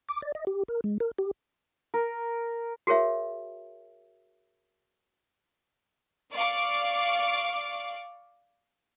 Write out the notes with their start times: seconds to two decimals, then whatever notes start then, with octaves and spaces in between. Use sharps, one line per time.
0.09 D6
0.22 D5
0.35 D#5
0.47 G4
0.68 A#4
0.84 G#3
1.00 A#4
1.19 G4
1.94 A#4
2.87 F#4 G#4 A#4 C#5 E5
6.33 D5 F5 C#6 D6